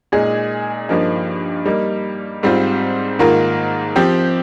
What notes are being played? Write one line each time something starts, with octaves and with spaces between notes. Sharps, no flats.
A#2 G#3 D#4 G#4
G2 F3 A#3 D#4
G3 A#3 D#4
G#2 G3 C4 F4 C5
G#2 D#3 A#3 F4 A#4
F3 C4 G4